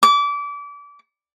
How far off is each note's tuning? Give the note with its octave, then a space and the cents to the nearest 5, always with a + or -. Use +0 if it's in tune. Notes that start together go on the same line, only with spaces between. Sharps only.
D6 -30